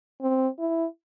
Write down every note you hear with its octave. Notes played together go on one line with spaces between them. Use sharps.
C4
E4